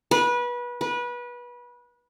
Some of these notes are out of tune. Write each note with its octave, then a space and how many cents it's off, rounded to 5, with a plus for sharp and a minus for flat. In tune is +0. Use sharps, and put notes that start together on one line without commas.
B4 -25
B4 -25